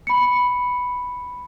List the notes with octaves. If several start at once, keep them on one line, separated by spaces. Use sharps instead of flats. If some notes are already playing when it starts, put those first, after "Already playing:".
B5 C#7